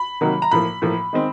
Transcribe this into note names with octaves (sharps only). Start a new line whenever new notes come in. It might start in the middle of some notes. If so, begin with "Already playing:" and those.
Already playing: B5
C3 D#3 F#3 A#3
A#5
A2 F3 A#3 B5
A2 F3 A#3
D#3 G#3 C4